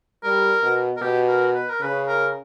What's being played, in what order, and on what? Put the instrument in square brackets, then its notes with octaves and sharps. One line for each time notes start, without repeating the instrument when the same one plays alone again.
[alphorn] G3 [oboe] A#4
[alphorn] B2
[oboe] A#4
[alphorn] B2 [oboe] G4
[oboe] A#4
B4
A#4
[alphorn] C#3 [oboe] B4
[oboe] A#4